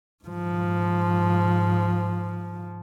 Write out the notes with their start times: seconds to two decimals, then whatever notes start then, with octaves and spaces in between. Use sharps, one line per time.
0.24 G#2 F3